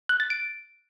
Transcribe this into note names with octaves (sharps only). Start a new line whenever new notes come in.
F#6
A6
D7